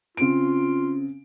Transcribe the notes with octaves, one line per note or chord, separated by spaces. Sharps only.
C#3 C4 F4 D7